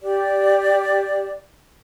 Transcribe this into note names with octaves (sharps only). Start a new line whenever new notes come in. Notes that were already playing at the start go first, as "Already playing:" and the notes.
G4 D5